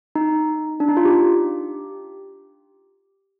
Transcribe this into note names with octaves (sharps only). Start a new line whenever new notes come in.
D#4
D4
D#4
F4
G4